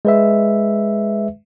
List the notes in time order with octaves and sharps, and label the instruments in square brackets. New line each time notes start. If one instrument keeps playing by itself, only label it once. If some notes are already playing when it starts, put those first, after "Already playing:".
[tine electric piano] G#3 B4 E5